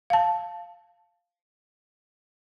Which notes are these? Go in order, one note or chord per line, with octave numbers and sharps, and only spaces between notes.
F5 A5